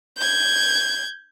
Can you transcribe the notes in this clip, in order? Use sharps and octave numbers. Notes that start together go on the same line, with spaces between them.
G6 G#6